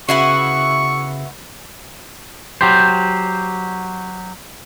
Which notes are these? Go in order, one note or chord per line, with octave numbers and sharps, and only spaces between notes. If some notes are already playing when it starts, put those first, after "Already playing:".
C#3 B3 E4 F#4 C#6 C7
F#3 G4 C5